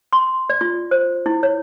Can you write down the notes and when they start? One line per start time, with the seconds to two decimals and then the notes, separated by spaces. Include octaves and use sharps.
0.13 C6
0.50 D5
0.61 F4
0.91 C5
1.26 E4
1.43 C#5